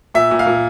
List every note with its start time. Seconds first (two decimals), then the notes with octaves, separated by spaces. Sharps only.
0.14 A#2 E5
0.31 A#2
0.39 F5
0.46 A#2